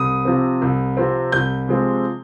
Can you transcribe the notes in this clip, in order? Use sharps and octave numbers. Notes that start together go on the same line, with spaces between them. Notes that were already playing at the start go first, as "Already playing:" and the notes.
Already playing: C2 D#6
C3 F3 C4
C2
C3 F3 C4
C2 G6
C3 F3 G#3 C4